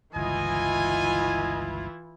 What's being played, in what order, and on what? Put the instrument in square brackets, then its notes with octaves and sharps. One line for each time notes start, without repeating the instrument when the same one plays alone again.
[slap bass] G1 C#2 [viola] E3 E4 [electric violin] F4 [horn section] D#5 G#5